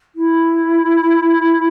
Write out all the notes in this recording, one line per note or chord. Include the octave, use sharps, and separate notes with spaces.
E4